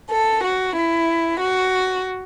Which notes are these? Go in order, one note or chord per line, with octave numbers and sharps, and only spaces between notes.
A4
F#4
E4
F#4